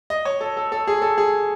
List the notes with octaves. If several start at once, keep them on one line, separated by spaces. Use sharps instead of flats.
D#5
C#5
A4
A4
A4
G#4
A4
G#4